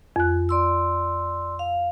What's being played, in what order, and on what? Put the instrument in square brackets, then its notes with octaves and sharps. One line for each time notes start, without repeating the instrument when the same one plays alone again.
[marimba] F2 F#6
[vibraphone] D5 C6 E6
F5